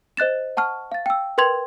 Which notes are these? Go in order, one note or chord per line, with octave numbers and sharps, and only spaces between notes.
C5 D#5 F#6 A6 E7
F#5 A5 C#6 F6
F5 A6
G5 E6
A#4 B4 G5 C6 G#6 F7